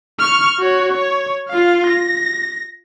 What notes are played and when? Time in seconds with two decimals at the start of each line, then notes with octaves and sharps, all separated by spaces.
0.19 C#6 F6
0.58 F#4 C#5
0.93 C#5
1.49 F4 F5
1.87 A#6